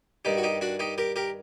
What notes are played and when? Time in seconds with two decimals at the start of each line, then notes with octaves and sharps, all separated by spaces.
0.25 G2 D#3 D#4 G4
0.37 F#4
0.43 D#4 G4
0.61 D4 F#4
0.79 D#4 G4
0.98 G4 A#4
1.16 G4 A#4